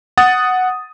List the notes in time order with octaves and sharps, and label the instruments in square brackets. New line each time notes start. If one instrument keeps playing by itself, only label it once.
[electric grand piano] F#5 D#6 A6